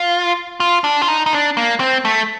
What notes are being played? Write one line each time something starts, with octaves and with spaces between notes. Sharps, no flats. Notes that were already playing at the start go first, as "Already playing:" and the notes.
Already playing: F4
F4
D4
F4
D#4
D#4
D4
A#3
C4
A3